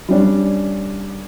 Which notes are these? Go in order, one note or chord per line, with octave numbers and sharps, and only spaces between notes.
G3 C#4 D4